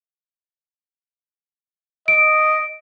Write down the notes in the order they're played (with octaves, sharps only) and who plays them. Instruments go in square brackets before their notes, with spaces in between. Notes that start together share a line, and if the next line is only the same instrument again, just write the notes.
[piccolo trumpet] D#5 [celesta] D7